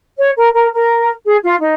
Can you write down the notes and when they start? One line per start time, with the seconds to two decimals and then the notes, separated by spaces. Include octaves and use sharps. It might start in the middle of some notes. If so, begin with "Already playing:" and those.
0.18 C#5
0.36 A#4
0.54 A#4
0.72 A#4
1.25 G#4
1.42 F4
1.59 D#4